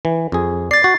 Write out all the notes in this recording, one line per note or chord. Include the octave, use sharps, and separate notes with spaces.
E3
F2 G#4
D5 A6 C7
F#4